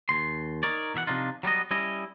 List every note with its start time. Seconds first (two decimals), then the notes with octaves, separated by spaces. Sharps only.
0.09 D#2 C6
0.63 D#4 A#4 C#5 D5
0.94 B2 E3 E5 F#5
1.07 C3 E3 F3 D4 D#4 F4
1.43 F#3 G3 B3 D#5
1.71 G3 C#4 E4 D#5